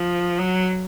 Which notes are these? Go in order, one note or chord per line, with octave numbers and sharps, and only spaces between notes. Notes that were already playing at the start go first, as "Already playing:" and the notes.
Already playing: F3
F#3